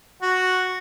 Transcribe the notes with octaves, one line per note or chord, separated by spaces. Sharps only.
F#4